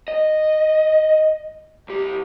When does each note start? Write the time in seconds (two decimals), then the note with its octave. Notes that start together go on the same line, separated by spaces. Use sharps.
0.08 D#5
1.89 C2 G4